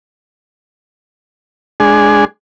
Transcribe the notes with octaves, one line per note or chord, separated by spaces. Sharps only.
G#3 D4 G#4